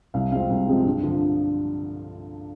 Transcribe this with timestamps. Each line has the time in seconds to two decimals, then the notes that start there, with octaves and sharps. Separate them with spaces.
0.14 C2 F5
0.32 C3 F3 G#3 C4 F5
0.50 C2
0.68 C3 F3 G#3 C4
0.86 G2
1.04 D3 F3